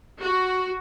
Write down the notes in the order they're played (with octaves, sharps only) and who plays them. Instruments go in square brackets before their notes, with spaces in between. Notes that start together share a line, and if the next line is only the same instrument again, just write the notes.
[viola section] F#4